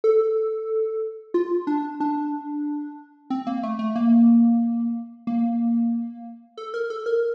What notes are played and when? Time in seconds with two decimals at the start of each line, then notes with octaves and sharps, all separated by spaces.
0.04 A4
1.34 F4
1.67 D4
2.00 D4
3.30 C4
3.47 A#3
3.63 A3
3.79 A3
3.96 A#3
5.27 A#3
6.57 A4
6.74 A#4
6.90 A4
7.06 A#4